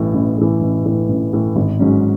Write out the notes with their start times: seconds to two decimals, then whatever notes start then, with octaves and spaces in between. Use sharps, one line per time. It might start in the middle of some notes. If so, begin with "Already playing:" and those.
Already playing: A1 A2 E3
0.14 A1
0.38 A2 E3
0.61 A1
0.86 A2 E3
1.08 A1
1.33 A2 E3
1.55 G#1
1.80 G#2 F#3 C#4